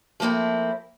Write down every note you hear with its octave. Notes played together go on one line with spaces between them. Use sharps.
F3 A3 A#3 C4 E4